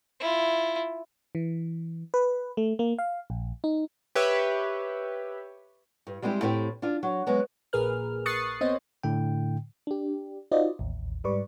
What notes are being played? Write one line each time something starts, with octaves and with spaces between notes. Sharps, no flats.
E4 F4
E3
B4
A3
A#3
F5
A#1
D#4
G4 B4 C#5 E5
G2
G3 G#3 C4 E4 G4
A2 C4 E4 G4 C5 G5
D4 F4
F#3
F#3 G#3 B3
A#1 A#2 G#4 A#4 B4 F6
C#6 D#6 F#6 A6 C7 C#7
B3 C4 C5 C#5 D#5
A2 D3 G5
D4 G4
D#4 F4 F#4 C5 D5 D#5
A1 D#2
G#2 G3 B4 D5 C#6